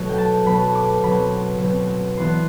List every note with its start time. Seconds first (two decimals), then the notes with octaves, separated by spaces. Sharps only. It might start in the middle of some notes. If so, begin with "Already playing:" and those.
Already playing: B2 F#3 A3
0.09 G5
0.18 A5
0.46 B2 F#3 A3 B5
0.75 D6
1.03 B2 F#3 C4 B5
1.58 B2 F#3 C4
2.17 E3 B3 D4 C6